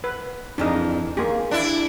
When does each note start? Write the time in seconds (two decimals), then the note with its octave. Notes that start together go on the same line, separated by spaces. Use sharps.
0.04 B4
0.58 F2 E3 D4 D#4 G#4
1.17 A#3 G4 G#4
1.51 D4 E4